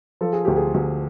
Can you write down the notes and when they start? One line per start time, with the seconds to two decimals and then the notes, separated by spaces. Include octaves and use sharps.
0.21 F3 A4
0.33 G#4
0.45 D2 G4
0.57 G#4
0.74 D2